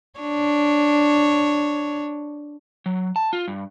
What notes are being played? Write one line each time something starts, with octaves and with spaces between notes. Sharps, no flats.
D4 C#5
F#3
A5
F4
G2